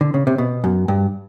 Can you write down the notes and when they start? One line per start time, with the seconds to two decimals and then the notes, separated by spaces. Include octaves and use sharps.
0.01 D3
0.14 C#3
0.27 C3
0.38 B2
0.64 F#2
0.88 G2